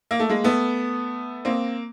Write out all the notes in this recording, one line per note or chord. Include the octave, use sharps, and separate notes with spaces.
A#3
A3
G#3 A#3
A3 B3
A#3 C4